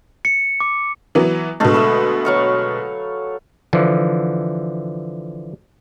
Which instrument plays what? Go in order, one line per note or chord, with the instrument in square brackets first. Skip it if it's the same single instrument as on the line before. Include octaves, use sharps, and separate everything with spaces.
[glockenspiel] C#7
D6
[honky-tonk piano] E3 F#3 B3
[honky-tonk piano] B2 D3 G#3 [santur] A3 A4 F5
[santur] B4 E5
F#3 F5 C#6
[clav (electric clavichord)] D3 E3 F3